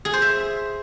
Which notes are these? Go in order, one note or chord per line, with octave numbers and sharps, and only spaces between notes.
G#4
C5
E5